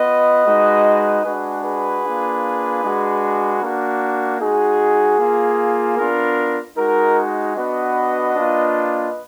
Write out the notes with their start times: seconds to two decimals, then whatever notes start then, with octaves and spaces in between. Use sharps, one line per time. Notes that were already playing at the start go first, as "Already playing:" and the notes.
Already playing: B3 F4 B4 D#5
0.45 G#3 D#4 F#4
1.24 G#3 D4 F#4 G#4 B4
1.63 G#4 B4
2.04 A#3 D4 F4
2.82 G#3 D4 F#4
3.61 A#3 D4 F#4 A#4
4.40 G#3 D#4 F#4 G#4
5.19 A#3 F4
5.97 B3 D4 F4 A#4
6.76 G#3 D#4 F#4 A#4
7.55 B3 D4 F#4 B4 D#5
8.35 A#3 D4 F4